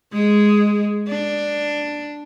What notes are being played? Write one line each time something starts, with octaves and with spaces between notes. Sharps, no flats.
G#3
D4